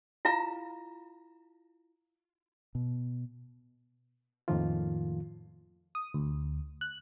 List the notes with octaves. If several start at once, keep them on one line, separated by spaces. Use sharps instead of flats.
E4 F4 F5 A#5
B2
F2 A2 D#3 F3 A#3 F4
D#6
D2
F#6